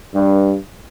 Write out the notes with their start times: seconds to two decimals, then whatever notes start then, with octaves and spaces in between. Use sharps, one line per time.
0.15 G2